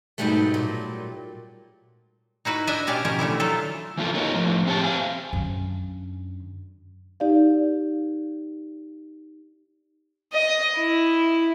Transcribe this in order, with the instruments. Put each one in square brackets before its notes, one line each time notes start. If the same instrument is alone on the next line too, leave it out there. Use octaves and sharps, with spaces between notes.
[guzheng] G#2 B2 F#3 G3 A3
A#2
[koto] D#4 E4 F#4 B4
D4 D#5 E5 G#5
B2 C#4 G4 D5 F5
B2 F3 C#4 A#4
D3 E3 A3 E4
F#3 A3 F4 A4
[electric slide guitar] E3 F3 A#3 F4 A4
D#4 A#4 C#5 D#5
A2 F3
C4 G4 C#5 A5
C5 F5 G#5
[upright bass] F#2 D3
[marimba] D#4 G4 D5 F5
[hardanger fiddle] D#5
E4